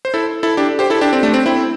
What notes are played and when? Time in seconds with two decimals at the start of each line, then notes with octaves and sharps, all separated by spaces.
0.05 C5
0.14 E4 A4
0.43 E4 A4
0.57 D4 G4
0.79 G4 C5
0.90 E4 A4
1.01 D4 G4
1.13 C4
1.23 A3 D4
1.34 C4
1.46 C4 E4